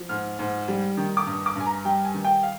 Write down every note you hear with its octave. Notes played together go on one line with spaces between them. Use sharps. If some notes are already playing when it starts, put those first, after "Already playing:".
Already playing: F3
G#2 F6
G#2
G3
D#3
D6
G2 D#6
D6
G2 G#5
A#5
G3 G5
G#5
D#3
G5
F5